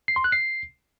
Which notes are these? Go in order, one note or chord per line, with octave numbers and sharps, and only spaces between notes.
C7
C6
F#6
C7